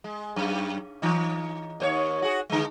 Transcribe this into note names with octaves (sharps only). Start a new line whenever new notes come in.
G#3
F#2
E3 D#4
D#2 C5 C#5
F#4 G#4
D3 G#3